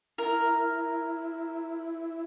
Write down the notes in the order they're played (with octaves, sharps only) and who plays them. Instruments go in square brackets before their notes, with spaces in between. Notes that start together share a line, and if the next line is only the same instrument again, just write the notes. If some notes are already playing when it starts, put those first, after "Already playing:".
[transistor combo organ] E4 [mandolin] A#4